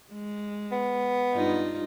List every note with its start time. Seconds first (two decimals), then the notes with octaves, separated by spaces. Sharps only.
0.12 G#3
0.72 B3
1.32 G2 D#4 F4